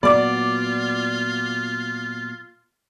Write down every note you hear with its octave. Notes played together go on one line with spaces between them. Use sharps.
A#2 F#3 B3 F4 D5 D6